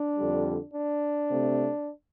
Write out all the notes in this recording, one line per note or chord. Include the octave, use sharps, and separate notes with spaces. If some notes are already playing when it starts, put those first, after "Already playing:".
Already playing: D4
F2 D3 G3
D4
C3 A3 C4